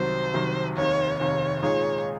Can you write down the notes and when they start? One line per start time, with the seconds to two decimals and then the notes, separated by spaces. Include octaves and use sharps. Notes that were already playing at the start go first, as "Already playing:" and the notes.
Already playing: C2 C3 D#3 F#3 C5
0.34 C2 C3 D#3 F#3
0.76 F1 D#2 D#3 C#5
1.20 F1 D#2 D#3 C#5
1.62 A#2 G#3 D#4 G#4 C#5